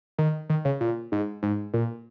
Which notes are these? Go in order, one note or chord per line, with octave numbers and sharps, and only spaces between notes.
D#3
D#3
C#3
A#2
G#2
G#2
A#2